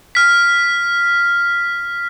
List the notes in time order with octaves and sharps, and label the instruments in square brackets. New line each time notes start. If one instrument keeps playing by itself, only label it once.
[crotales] F6 B6